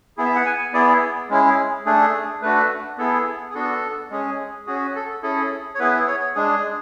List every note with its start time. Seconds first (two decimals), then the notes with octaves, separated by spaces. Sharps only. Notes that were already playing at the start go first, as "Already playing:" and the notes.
0.17 B3 E4 G#4
0.25 E5
0.35 F#5
0.46 G#5
0.73 B3 E4 G#4 D5
1.30 G#3 C#4 E4 G#4
1.86 A3 D4 G#4
2.42 A3 D4 F#4 B4
2.98 B3 E4 G#4 A4
3.50 G#4
3.54 B3 D4 F#4 A4
4.11 G#3 C#4 G#4
4.67 C#4 F#4 G#4
4.95 A4
5.23 C#4 E4 G#4 A4
5.75 C#5
5.79 B3 E4 G#4 B4
6.07 C#5
6.35 G#3 D4 G#4